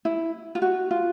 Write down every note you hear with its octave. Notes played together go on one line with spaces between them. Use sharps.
E4
F4
F#4
F4